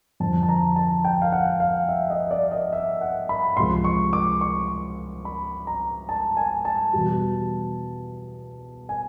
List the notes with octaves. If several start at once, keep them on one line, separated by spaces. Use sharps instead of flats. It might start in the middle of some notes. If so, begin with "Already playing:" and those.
F2 D3 F3 A5
A5
A#5
A5
G5
F5
F#5
F5
E5
D#5
D5
D#5
E5
F#5
B5
C#2 C3 F3 G#3 C6
C#6
D6
C#6
B5
A#5
A5
G#5
A5
E2 B2 G3
G#5